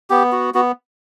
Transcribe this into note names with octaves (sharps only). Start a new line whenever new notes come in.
B3 G4
F#4
B3 F#4